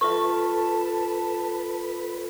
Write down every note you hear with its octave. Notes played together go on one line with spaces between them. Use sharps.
F4 A4 B4 E5 A5 C#6